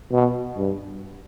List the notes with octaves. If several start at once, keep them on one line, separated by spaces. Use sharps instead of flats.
B2
G2